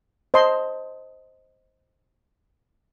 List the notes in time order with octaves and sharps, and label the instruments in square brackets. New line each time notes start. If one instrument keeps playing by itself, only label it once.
[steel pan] C5 D#5 A5 C6